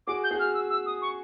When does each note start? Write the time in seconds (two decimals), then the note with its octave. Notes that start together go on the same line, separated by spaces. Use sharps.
0.07 F#4 G#4 D6
0.24 G6
0.31 F#4 G#4
0.39 F6
0.54 E6
0.70 E6
0.86 D#6
1.02 C#6